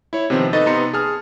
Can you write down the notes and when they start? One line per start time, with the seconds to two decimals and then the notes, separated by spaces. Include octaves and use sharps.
0.13 E4 C#5
0.30 C3 D#3 F3 B3 C4
0.53 D#4 A4 B4 D#5 C#6 A6
0.66 C3 B3 D#4 A#5 C6 C#7
0.93 G#4 A5 F6